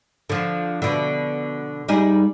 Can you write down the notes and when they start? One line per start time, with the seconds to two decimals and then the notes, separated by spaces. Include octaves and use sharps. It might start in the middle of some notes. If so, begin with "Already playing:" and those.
0.30 D3 F3
0.82 B2 D3
1.88 G3 D#4 G#4